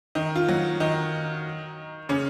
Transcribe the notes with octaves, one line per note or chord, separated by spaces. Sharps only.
D#3 D#4
F4
F#3 F#4
D#3 D#4
C#3 C#4